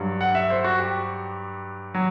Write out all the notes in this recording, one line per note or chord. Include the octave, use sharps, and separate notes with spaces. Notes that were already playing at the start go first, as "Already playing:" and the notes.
Already playing: G2 F#3
F#5
E5
C5
F#4
G4
F#3